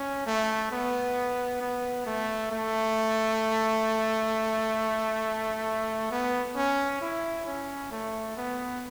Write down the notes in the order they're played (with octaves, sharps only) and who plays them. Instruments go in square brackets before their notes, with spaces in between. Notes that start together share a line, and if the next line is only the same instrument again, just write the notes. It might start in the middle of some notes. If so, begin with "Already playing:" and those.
Already playing: [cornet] C#4
A3
B3
B3
A3
A3
B3
C#4
E4
C#4
A3
B3